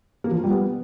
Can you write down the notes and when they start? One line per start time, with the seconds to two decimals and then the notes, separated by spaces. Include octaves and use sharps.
0.24 A#3
0.31 F3
0.37 F4
0.44 G3
0.50 B3